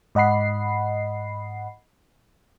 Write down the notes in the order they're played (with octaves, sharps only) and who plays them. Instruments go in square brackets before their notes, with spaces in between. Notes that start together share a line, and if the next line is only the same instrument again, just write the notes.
[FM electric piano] G#2 D#5 F#5 B5 C7